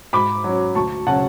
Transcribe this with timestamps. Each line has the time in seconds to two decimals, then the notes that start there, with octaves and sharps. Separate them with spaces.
0.13 G#2 B5 D6
0.44 F#3 C#4
0.75 D2 A5 C#6
1.07 C#3 F#3 C#4 F#5 A5